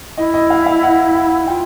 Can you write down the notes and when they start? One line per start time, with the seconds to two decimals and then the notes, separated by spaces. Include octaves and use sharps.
0.17 E4 D#5
0.34 D#5
0.50 F5
0.66 F5
0.83 F#5
1.15 F#5
1.47 F4 G5